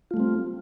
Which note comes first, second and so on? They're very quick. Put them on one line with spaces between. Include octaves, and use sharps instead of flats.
F4 A3 G3 C4